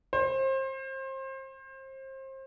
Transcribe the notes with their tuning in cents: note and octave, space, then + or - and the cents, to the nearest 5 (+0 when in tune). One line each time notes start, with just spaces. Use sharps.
C5 +30